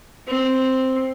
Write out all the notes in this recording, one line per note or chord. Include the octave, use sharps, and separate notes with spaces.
C4